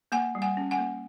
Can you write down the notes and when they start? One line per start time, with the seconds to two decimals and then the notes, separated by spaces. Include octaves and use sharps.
0.12 A#3 F#5 G#5
0.35 G3
0.42 F#5 G#5
0.57 C#4
0.71 F#5 G#5
0.78 A#3